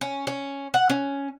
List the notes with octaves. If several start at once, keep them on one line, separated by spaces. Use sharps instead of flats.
C#4
C#4
F#5
C#4